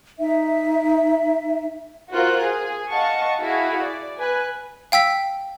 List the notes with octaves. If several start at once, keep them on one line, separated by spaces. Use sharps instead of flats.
D#4 E5
F4 F#4 A#4 C5 F#6
G#4
D#5 F5 F#5 A5 C#6
E4 F#4 G#4 F5
D5
B4 G#5 F#6
F5 G5 E6 B6